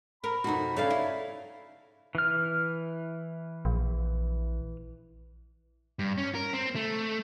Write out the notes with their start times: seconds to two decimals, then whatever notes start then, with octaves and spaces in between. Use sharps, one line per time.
0.24 A#4 B5
0.44 F2 B2 D#4 F#4
0.77 C#3 A4 C#5 D5 F5
0.91 E4
2.15 E3 F6
3.65 A#1
5.99 G2
6.18 C#4
6.35 A#4
6.53 C4
6.75 A3